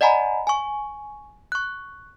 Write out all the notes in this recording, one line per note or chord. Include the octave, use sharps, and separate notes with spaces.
D5 D#5 F#5 G#5 A#5 B5
G#5 C#6
C#6 F#6